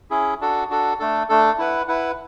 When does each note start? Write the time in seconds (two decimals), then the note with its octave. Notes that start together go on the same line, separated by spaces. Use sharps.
0.10 C#4 E4 G#4
0.41 D4 F#4 A4
0.70 D4 F#4 A4
0.99 A3 D4 A4
1.29 A3 D4 A4
1.58 E4 B4 F#5
1.88 E4 B4 F#5